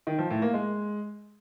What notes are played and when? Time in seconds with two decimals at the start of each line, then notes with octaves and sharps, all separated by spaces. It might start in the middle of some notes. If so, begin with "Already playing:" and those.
0.07 D#3
0.19 F3
0.30 A2
0.42 A#3
0.54 G#3